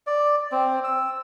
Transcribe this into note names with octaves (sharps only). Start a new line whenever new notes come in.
D5
C4
E6